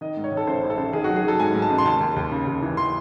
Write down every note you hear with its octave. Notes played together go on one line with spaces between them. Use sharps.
D#3 D#5
G#2
C#5
D#3
A4
A1 C5
A1
A4
A1
D#3 G#4
F#3 F#4
G#4
F#3 A4
G#2 G#5
G#2
A5
A1
C6
D#2 A5
D#2
D#2
C#3
D#2
E3
E3 C6